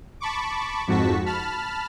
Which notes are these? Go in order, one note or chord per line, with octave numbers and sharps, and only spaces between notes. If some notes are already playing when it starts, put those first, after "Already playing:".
A5 B5 C#6 D6
F2 G#2 F#4 A5 C#6 B6
A5 B5 F6